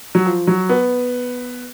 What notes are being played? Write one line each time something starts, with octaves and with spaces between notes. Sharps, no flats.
F#3
F3
F#3
B3